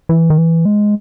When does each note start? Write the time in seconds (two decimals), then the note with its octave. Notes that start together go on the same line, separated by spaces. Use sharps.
0.09 E3
0.30 D#3
0.38 E3
0.65 G#3